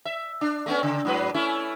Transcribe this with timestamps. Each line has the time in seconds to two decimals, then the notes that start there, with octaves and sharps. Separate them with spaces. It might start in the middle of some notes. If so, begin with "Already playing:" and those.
0.05 E5
0.41 D4
0.66 A3 B3 C#4
0.83 C#3
1.05 G#2 F#3 B4
1.34 A3 C#4 E4